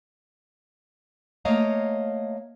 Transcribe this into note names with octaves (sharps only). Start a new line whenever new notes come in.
A3 A#3 C#5 D#5 F5 A#5